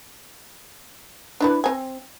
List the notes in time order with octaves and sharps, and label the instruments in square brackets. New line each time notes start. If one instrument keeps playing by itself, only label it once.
[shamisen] D4 E4 B4
C4 G#5